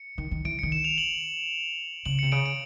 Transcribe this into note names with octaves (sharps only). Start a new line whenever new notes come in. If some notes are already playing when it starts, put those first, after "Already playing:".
Already playing: C#7
D#3
D#3
E3 D7
D#3 C#7
E7
F7
F#7
C#3 F#7
C3 C#7
C#3 D7
D7